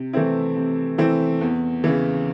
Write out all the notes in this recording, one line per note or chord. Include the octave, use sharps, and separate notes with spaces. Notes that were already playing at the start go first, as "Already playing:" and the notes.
Already playing: C3
E3 A3 C4 E4
C3
E3 A3 C4 E4
E2
C#3 E3